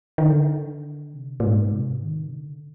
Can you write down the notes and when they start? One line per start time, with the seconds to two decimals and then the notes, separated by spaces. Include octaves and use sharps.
0.18 D#3
0.26 D3
1.14 C3
1.40 A#2
1.43 G#2
1.73 C3
2.02 D#3
2.23 C3
2.33 D3